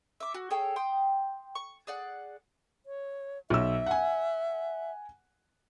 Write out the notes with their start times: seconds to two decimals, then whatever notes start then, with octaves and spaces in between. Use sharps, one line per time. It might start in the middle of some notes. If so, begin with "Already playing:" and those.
0.20 E5 D6
0.34 F#4
0.50 G#4 A4 C#5 G5
0.76 G5 C6 D#6
1.55 C#6
1.87 G#4 D5 F#5
2.86 C#5
3.50 B1 E5 E6
3.86 F#5 G#5